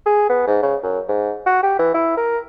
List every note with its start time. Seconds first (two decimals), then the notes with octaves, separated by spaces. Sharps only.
0.06 G#4
0.29 B3
0.47 G#2
0.63 C#3
0.83 F#2
1.08 G#2
1.46 F#4
1.63 G4
1.79 E3
1.94 E4
2.17 A#4